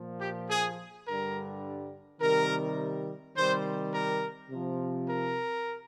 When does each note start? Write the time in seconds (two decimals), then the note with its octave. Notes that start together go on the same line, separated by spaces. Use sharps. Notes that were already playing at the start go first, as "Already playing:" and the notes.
Already playing: A#2 F3
0.21 G4
0.50 G#4
1.06 G2 D3 G3 A#4
2.21 C3 D#3 G3 A#4
3.36 C3 D#3 G3 C5
3.93 A#4
4.50 C3 F3
5.08 A#4